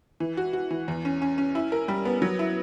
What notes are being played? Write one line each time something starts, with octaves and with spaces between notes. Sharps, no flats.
E3
F#4
F#4
E3
E2
C#4
C#4
C#4
E4
A#4
G3
B3
F#3
E4